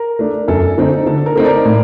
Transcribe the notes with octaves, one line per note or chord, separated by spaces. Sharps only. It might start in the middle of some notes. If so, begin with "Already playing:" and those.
Already playing: A#4
A3 D4
F#2 A4
D3 A3 C4 D#4
D3 A4
A#4
A3 C4 D#4
A#4 D5
A2